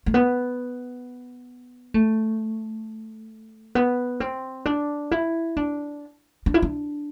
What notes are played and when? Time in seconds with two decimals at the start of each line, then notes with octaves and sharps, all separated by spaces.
0.06 A3
0.14 B3
1.94 A3
3.75 B3
4.20 C4
4.66 D4
5.11 E4
5.57 D4
6.46 D4
6.54 E4
6.62 D4